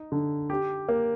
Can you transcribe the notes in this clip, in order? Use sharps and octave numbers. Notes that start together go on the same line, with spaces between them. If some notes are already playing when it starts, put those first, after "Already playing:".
Already playing: D#4
D3
G4
A#3